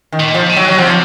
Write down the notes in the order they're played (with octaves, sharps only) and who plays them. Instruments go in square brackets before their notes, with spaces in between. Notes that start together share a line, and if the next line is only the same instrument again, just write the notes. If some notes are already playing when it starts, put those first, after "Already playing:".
[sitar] D#3
[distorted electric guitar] A#2
[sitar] F3
[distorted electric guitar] C#3
[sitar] F#3
F#3
[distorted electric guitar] C3 [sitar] F3